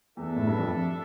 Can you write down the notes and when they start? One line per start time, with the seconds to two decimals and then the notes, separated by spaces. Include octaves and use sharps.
0.17 E2 D4 A4 E5
0.36 A2
0.47 G2
0.58 F2